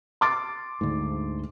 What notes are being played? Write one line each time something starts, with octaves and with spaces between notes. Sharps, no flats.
C6 D6 A6
D2 G#2